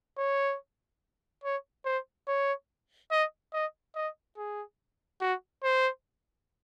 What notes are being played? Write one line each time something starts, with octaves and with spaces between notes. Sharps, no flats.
C#5
C#5
C5
C#5
D#5
D#5
D#5
G#4
F#4
C5